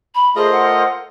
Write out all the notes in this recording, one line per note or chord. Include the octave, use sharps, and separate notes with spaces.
B5
A3 F4 G#4 A#4 C5 D#5 C6
F#5